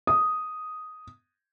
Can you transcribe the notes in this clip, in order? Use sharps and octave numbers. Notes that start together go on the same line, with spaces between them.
D#6